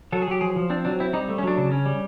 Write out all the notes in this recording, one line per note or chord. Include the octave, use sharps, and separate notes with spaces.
F#3 A4
G#4
F#3 G4
F3 G#4
F3
C4 D4
F#3 D4
C4 E4
G3 D#4
A3
C#4
F#3 D4
C#3
C#4
G3